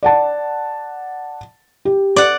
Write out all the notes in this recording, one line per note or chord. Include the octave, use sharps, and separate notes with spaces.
D5 F#5 A5
G4
D5 F#5